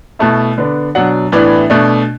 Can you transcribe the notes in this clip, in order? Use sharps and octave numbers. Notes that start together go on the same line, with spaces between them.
B2 A3 E4 A5
D3 B3 D4
B2 F#3 D4 F#5
A2 E3 B3 D4 D5
B2 A3 D4